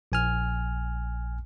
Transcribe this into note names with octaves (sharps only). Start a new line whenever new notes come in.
A#1 G#5 F6